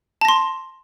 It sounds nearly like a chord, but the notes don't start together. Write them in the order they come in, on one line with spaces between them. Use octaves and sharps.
A5 A#6 C6